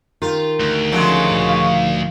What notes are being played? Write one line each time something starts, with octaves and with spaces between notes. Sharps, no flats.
D#3 F4 G4
D2
C#3 F3 F#3 G#3 A3 C5
A#2
D#4 F5